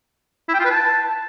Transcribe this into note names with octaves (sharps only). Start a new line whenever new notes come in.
E4
G5
F4
B4
A5